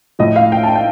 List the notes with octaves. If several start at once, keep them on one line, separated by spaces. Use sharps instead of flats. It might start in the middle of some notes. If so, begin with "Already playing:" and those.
A2 F3 D#5
F5
G5
A5
G5